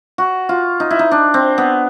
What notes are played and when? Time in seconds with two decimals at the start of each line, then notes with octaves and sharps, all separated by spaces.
0.18 F#4
0.49 F4
0.80 D#4
0.91 E4
0.99 D#4
1.11 D4
1.34 C4
1.58 B3